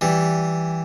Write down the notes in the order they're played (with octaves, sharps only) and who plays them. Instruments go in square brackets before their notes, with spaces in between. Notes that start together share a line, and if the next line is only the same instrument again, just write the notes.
[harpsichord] E3 G3